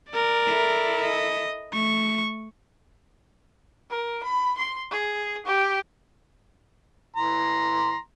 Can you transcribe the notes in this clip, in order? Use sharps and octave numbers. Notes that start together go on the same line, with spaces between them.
A#4 D5
E4 A4
D#5
A3 C#6
A#4
B5
C6
G#4
G4
E3 A#5 C6